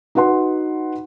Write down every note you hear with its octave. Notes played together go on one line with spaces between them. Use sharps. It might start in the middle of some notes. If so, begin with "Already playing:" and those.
D#4 F#4 B4 F#5 C6